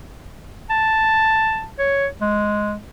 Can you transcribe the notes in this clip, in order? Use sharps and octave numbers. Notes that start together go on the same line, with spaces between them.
A5
C#5
G#3